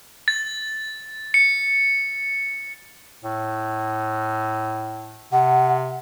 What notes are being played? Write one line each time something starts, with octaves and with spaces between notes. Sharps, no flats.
A6
C#7
A2
C3 F#5